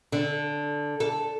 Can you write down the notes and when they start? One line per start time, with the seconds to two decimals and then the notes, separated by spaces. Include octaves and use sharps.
0.12 D3
1.00 A4